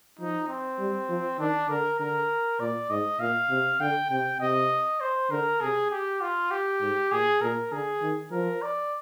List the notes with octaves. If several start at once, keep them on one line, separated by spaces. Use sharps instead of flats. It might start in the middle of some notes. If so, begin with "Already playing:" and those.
F3 D#4
C4
G3
F3
D#3 D4
D3 A#4
D3 A#4
A#2 D5
G#2 D#5
A#2 F5
C3
D3 G5
C3 G5
C3 D#5
C5
D3 A#4
C3 G#4
G4
F4
G4
G#2
A#2 G#4
A#2 A#4
D3 G#4
D#3
F3 A#4
D5